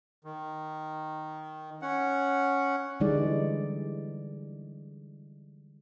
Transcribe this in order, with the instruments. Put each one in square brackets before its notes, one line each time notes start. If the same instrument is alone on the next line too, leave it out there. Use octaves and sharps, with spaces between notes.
[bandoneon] D#3
C#4 F#5
[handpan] D3 E3 G3 G#3 D#4 D5